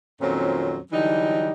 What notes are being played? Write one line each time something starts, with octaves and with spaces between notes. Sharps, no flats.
F2 A#2 D#3 F#3 C4 C#4
D3 E3 F#3 G3 D#4